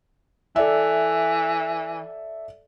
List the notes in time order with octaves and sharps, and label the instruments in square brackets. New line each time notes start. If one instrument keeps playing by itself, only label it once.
[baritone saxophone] E3 [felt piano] A4 D5 E5